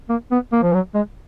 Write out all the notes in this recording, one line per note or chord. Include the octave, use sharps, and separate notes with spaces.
A#3
B3
A#3
F3
F#3
G#3